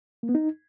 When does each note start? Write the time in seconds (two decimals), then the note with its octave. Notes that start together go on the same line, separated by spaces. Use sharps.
0.23 A#3
0.29 B3
0.35 D#4